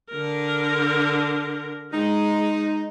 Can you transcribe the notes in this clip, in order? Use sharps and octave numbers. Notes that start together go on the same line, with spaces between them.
D3 A#4
G#3 D#4